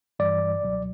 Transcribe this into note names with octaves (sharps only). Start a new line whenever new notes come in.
G2 E3 G3 D5
C#2 B2 F#3